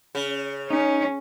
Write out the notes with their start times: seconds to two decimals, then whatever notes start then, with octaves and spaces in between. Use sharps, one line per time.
0.15 C#3
0.70 C#4 D#4